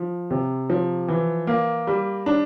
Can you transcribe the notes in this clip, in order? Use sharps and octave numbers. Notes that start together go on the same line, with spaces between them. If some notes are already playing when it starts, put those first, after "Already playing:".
Already playing: F3
C3
F3
E3
A#3
G3
D4